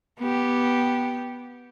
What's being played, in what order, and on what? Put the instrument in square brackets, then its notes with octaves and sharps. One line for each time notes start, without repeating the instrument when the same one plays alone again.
[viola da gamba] B3 G4